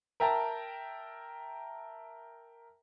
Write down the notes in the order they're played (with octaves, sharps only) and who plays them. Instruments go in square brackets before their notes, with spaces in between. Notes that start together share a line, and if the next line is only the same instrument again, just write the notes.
[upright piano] A#4 E5 G5 A5 A#5